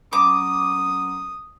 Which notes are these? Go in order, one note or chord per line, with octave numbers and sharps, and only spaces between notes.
F#3 C#4 A#5 D6 D#6